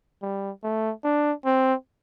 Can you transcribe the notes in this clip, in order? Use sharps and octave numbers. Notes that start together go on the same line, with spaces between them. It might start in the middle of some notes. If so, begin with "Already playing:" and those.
G3
A3
D4
C4